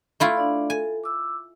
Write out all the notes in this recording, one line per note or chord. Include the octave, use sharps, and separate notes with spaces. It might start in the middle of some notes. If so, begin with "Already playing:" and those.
A3 E4 F4
D4 D5
A4 G#5
D6 E6